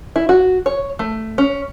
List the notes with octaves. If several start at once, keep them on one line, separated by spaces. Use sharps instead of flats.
E4
F#4
C#5
A3
C#4